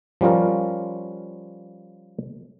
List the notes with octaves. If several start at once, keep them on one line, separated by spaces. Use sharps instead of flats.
F3 G3 C#4 F4 A#4